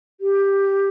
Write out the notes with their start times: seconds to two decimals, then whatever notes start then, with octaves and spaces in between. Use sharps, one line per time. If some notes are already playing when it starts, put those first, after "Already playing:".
0.20 G4